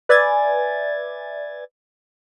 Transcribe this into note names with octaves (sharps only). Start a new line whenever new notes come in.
B4 D5 E5 G#5 G#6 A6